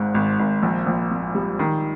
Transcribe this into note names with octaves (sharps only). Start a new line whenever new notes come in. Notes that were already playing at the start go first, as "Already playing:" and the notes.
Already playing: G#1 G#2
G#1
G#1
A#1
A#1
A#2
G3
D#3